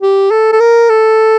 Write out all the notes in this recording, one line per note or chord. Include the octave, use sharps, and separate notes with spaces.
G4
A4
A4
A#4
A4